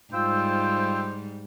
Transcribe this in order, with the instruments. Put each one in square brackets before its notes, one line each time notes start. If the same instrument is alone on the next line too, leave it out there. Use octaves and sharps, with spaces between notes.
[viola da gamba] G#2 G3 [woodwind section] F4 G5 E6 [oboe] C5